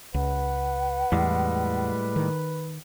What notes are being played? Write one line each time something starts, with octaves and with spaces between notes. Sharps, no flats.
C#2 B4 F#5
E2 A2 G3 G#3
D#3